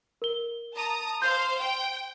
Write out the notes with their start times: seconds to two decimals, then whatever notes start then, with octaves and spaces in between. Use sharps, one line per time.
0.22 A#4 G7
0.76 A5 A#5 D#6
1.22 C5 F5 C6 G6
1.60 G5